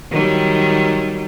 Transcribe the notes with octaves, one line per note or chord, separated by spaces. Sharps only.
D#3 F#3 G3